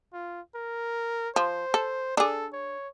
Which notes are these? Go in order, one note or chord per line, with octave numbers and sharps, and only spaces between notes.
F4
A#4
F3 C5
A4
D4 G#4 A4
C#5